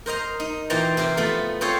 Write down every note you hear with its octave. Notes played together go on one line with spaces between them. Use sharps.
A#4 C5 D#5 A#5
D#4
A#2 E3 C5 G5 A5 A#5
C3 E4 A#4 C5
F3 A3 B3 F4
C4 F4 G#4 A4 C5 C#5